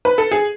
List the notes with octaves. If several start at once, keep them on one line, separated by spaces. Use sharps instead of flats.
B4
A4
G#4